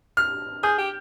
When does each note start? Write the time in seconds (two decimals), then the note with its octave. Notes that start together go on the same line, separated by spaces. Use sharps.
0.17 F6
0.63 G#4 G6
0.78 G4